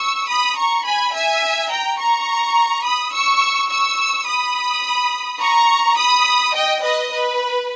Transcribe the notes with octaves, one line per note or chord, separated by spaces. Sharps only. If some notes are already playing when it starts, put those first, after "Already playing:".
Already playing: C#6 E6
B5 D#6
A#5 C#6
G#5 B5
E5 G#5
G5 A#5
A#5 C#6
B5 D#6
C#6 E6
C#6 E6
B5 D#6
A#5 C#6
B5 D#6
D#5 G5
B4 D#5
B4